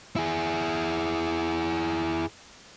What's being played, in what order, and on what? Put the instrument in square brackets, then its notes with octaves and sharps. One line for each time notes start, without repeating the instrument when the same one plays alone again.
[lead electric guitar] E4 G#4